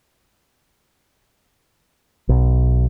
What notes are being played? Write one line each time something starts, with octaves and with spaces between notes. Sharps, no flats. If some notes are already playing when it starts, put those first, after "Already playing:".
B1